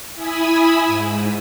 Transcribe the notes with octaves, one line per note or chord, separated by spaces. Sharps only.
E4 G#5 B5 D#6 E6
G#2